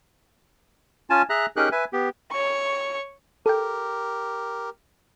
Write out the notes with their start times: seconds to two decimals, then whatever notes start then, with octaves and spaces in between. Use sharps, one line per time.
1.10 C#4 F4 G#5 A5
1.30 G#4 E5 A#5 F#6
1.57 C#4 D#4 G4 G#4 A#4 F#6
1.72 B4 E5 G#5
1.93 B3 G4
2.31 C#5 C#6
3.46 G4 A4 A#4 G5